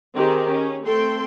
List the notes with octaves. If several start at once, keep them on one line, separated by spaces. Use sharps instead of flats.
D#3 C4 G4 G#4
C#4 G#4
A3 C4 A4 G5 C6